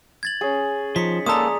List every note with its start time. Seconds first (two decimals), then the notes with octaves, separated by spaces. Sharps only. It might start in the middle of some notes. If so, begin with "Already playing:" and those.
0.23 G#6 A6 F#7
0.41 C#4 G#4
0.96 F3 D#4 B6 C#7
1.26 G#3 A#3 A4 D5 A#5 D#6